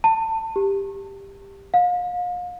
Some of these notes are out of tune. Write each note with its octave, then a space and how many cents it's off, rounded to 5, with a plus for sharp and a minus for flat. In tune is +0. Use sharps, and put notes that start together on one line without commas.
A5 +25
G4 +10
F5 +35